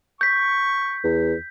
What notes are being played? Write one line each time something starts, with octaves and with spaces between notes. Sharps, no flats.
C#6 G6 B6
E2